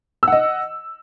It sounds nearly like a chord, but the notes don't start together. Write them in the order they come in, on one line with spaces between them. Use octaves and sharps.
E6 F#5 D#5